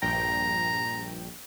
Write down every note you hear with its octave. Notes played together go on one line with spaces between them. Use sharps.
A#1 G2 G5 A#5